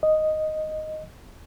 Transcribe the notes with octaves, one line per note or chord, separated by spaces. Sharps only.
D#5